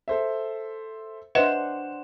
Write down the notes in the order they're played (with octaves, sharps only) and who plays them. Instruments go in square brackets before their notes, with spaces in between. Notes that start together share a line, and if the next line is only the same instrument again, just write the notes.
[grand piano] A4 C5 E5
[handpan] D4 C5 F#5 [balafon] B4 D#5 E5 [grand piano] E7